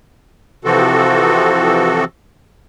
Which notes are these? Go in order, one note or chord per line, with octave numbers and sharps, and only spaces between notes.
C3 E3 F3 C4 F#4 A4